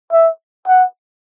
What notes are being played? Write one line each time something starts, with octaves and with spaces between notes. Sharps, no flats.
E5
F#5